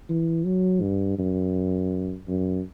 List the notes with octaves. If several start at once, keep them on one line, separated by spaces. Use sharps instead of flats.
E3
F#3
G2
F#2
F#2